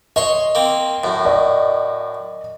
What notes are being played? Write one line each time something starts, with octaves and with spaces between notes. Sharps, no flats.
C#5 D#5 C6 C#6
A#3 C4
F#2 A2
D5 D#5